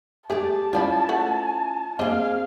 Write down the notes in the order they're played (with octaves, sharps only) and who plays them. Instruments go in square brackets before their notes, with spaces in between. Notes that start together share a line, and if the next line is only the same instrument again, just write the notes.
[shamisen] A3 G#4 [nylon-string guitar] G4 D5 [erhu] A5
[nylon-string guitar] C#4 E4 F4 [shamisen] C5 D5 B5
[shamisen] F3 A3 F#4
[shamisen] A#3 D4 D#5 [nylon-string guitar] C4 G#4 [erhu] F5